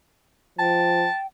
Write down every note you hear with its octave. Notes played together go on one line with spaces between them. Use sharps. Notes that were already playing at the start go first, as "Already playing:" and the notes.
F3 G5 A5